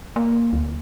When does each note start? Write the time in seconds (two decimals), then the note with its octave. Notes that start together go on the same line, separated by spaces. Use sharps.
0.16 A#3
0.53 D2